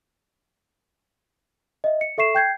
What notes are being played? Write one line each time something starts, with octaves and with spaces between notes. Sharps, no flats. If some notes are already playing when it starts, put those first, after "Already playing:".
D#5 E5
C#7
A4 E5 C#6 C7 E7
G5 G6 G#6 C7